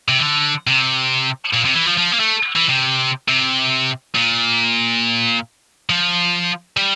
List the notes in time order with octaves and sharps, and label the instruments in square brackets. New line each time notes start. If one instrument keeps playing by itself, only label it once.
[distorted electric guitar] C3
E3
D3
C3
A#2
C3
E3
F3
F3
A#3
A3
E3
C3
C3
A#2
F3
G3